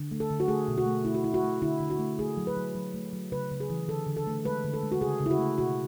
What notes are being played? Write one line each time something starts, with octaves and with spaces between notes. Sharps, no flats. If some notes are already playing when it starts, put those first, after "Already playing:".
Already playing: D3
A3
A4
D3
F#4
A3 G#4
B2
F#4
A3
A3 E4
F#4
A3 E4
F#4
A3
D3 E4
D3
F#4
A3
A3 G#4
F#3
B4
F#3
F#3
A3
F#3
C#3 B4
C#3
G#4
E3
D3 A4
D3
A4
A3
G#3 B4
D3
A4
G#3
F#4
C#3 G#4
C#3
E4
F#4
A3
B2 F#4